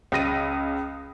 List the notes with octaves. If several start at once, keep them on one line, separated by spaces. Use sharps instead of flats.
C#2 D#6 A#6 D#7